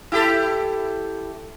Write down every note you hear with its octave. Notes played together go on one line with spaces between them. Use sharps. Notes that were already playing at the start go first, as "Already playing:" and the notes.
E4 G4 A4